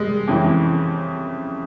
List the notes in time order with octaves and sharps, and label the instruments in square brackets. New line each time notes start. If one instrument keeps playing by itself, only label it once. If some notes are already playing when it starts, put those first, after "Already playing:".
Already playing: [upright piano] G3 G#3
F2 C#3 E3